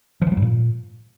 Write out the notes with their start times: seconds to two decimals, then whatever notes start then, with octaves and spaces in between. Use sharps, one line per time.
0.22 F3
0.27 E3
0.32 F#3
0.37 G2
0.42 A#2